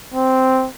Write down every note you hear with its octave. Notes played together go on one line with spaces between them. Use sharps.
C4